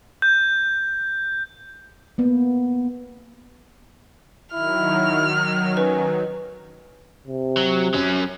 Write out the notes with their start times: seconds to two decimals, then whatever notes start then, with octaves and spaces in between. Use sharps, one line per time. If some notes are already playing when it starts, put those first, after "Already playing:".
0.22 G6
2.18 A#3 B3
4.54 D#3 F#3 E4 F6
5.77 C#4 B4
7.28 C3
7.57 F#3
7.94 F#3 C#4